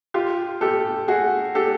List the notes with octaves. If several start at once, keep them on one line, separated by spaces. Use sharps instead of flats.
F4 G4
G4 A4
F#4 G#4
G4 A4